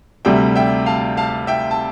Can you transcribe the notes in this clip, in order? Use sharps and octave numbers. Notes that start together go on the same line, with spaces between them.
D2 C3 G3 E5 G5
E5 G5
F5 A5
F5 A5
E5 G5
A5